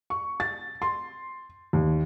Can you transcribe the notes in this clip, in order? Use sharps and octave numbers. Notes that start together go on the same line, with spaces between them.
C#6
A6
C6
D#2